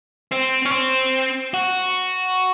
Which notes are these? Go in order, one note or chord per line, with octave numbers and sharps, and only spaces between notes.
C4
C#4
C4
F#4